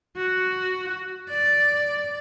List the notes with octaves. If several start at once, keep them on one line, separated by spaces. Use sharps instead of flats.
F#4
D5